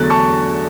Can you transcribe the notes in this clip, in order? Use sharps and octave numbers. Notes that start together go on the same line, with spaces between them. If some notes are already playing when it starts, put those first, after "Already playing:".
Already playing: E2 D3 F#3 A3 F#6 A6
A5 C#6